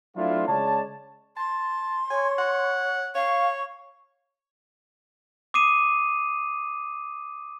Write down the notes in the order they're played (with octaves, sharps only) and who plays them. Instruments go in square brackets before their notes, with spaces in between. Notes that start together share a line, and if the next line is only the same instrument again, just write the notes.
[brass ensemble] F#3 A3 C4 D4 E4 F4
C#3 G#3 C#5 D5 A5
[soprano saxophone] A5 [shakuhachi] C6
[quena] C#5 [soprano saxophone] G#5
[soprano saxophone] F#5
[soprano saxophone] C#5 [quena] F5 [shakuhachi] C#6
[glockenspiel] D6 D#6 C7 D#7 E7